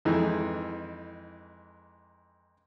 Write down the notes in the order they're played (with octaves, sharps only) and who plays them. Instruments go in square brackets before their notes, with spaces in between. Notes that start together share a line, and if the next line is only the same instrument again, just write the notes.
[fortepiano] F2 G#2 E3